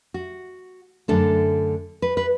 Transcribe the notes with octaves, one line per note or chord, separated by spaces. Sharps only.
F#4
F#2 D3 A3 D4 A4
B4
B4